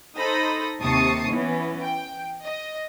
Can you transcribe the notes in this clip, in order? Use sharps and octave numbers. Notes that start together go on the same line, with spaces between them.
D#4 A4 C5 B5 D#6 A#6
D#2 C3 A5 C#6 D#6 C7
E3 B3 C#4
G5
D#5